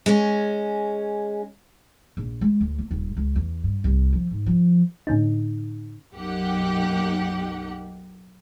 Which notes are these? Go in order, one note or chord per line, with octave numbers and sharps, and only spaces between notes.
G#3 C#4
A#1
G#3
D2
A#3
D#1
C#2
E2
G2
C2
F3
G#2
F3
A2 D3 C#4 D#4
B1 F#2 A#3 D#4 G4 F#5